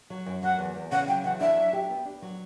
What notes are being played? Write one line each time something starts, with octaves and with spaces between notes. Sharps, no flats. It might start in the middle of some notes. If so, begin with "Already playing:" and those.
F#3
F#2
F#3 F#5
E2
E2
C#3 F#5
F#3 G5
E2 F#5
D4 E5
F#3
G4
B3
D4
F#3